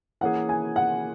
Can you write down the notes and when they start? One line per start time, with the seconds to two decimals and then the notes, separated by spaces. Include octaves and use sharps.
0.21 E3 A#3 C#4 G#4 F#5
0.49 G#5
0.76 F#5